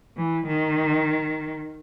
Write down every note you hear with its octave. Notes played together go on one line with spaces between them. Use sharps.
E3
D#3